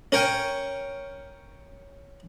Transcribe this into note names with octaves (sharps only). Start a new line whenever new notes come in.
C#4 A#4 C#5 G5 G#5